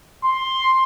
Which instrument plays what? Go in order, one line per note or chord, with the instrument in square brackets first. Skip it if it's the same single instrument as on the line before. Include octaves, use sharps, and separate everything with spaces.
[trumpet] C6